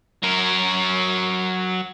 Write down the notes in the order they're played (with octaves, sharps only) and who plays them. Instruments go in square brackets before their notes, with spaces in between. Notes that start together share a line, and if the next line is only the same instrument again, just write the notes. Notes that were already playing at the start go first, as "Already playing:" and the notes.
[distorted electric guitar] F#3 A#4